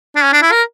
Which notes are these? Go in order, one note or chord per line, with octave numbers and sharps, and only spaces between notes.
D4
C#4
D4
E4
A#4